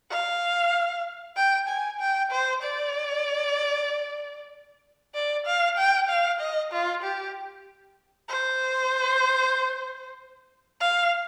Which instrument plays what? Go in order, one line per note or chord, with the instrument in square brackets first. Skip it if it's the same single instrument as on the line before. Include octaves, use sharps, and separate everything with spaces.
[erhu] F5
G5
G#5
G5
C5
D5
D5
F5
G5
F5
D#5
F4
G4
C5
F5